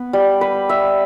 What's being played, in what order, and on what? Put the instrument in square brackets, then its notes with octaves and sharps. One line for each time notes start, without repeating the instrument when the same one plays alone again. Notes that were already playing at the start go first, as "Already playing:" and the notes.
Already playing: [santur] B3
G3
B4
E5